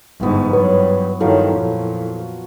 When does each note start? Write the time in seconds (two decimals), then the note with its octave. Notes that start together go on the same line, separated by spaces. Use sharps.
0.21 G1 G#2 E3 B3
0.53 G2 F#3 B4 C#5
1.20 G2 D#3 F3 F#3 E4 A4 F5
1.56 F2 A#2